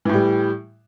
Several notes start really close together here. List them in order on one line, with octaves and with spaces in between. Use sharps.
E3 A2 G3